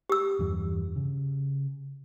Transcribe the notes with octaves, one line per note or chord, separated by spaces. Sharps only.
G4 E6
E2 G2 E3
C#3